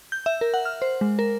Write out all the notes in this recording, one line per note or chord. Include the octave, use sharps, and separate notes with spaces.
G6
E5
A#4
F#5
F6
C5
G#3
A#4